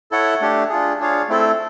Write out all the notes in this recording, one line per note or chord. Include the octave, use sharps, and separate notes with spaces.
E4 A4 C#5 F#5
A3 D4 G4
D4 F4 G#4
D4 F4 G#4 C#5 F5
A3 C4 E4 A4